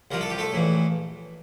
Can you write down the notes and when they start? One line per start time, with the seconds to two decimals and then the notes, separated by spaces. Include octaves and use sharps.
0.11 C2 C3 F3 A#4
0.21 A4
0.30 G4
0.38 A3 A4
0.52 A#1 A2 E3